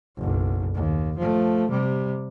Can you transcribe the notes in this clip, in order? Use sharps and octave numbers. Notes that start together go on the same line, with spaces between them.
F#1 B1
D#2
F3 A3
C3 G3